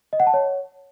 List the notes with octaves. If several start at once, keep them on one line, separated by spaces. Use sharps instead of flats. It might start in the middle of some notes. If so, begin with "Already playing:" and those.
D#5
F#5
A5
C#5